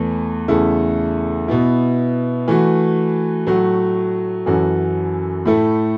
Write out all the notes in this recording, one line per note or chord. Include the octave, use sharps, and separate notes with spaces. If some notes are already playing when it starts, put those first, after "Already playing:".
Already playing: E2 E3 A3
E2 C#3 A3 E4 A4
B2 B3 E4
E3 A3 F#4
A2 F#3 A3 F#4
F#2 E3 C#4 F#4 A4
A2 A3 E4 A4